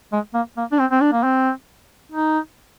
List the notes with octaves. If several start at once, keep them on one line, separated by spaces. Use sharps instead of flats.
G#3
A#3
A#3
D4
C4
C4
D4
A#3
C4
D#4